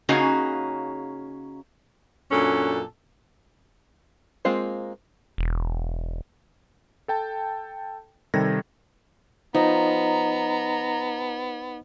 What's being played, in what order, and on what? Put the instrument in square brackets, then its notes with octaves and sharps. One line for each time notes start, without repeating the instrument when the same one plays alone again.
[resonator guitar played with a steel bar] C#3 A#3 C#4 D#4 F#4 G#4
[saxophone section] F#2 A#2 C#4 D4 A4
[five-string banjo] G#3 A#3 C4 F4 C5
[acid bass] E1
[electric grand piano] A4 G5 A5
C3 D#3 G3 A4 G#6 A#6
[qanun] F3 [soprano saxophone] B3 [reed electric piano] D#4 D#5 [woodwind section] A#5